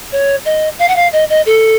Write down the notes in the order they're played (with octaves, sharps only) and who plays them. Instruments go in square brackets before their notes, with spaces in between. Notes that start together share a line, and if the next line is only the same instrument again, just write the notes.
[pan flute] C#5
D#5
F5
F#5
F5
D#5
D#5
A4